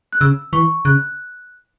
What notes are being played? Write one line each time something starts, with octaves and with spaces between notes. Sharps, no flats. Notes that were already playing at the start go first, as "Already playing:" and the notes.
F#6
C#3 E6
E3 C#6
C#3 F#6